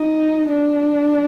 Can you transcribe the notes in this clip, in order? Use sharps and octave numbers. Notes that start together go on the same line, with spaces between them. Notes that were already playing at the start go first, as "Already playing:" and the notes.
Already playing: D#4
D4